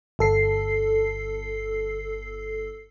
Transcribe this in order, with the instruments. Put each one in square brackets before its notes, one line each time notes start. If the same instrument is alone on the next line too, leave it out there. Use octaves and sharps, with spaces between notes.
[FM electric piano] G1 A4 C7